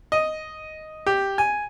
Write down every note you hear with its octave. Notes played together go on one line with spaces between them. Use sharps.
D#5
G4
G#5